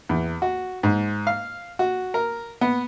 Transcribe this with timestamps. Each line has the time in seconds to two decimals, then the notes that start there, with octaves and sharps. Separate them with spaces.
0.09 E2
0.42 F#4
0.83 G#2
1.27 F5
1.79 F#4
2.14 A#4
2.61 B3